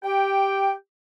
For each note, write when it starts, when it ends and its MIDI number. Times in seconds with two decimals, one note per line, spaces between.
0.03 0.72 67
0.03 0.72 79